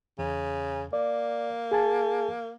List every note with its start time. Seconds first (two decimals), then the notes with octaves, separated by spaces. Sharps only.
0.19 E2 C#3
0.93 A#3 D5
1.71 G#4 G#5 A5